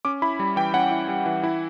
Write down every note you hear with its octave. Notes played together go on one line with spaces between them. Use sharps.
C#4 D6
E4 B5
G3
E3 G5
C#4 F#5
E4
G3
E3
E4